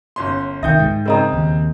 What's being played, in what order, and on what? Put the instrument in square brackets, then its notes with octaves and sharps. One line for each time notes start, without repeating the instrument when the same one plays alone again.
[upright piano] G1 C#4 C6
[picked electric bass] C2 D#3 [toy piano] E5 G5 [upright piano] D#6 G6
[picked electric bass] G#2
[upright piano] C#3 C4 D#6 [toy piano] A#4 D#5 A#5
[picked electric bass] D#2